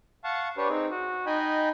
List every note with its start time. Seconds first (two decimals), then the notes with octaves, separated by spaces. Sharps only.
0.24 F5 F#5 A5 C#6
0.57 D4 G4 B4 C#5
0.69 C4 D#4 G#4
0.91 F#4
1.26 D#4 D#5 G5 G#5 B5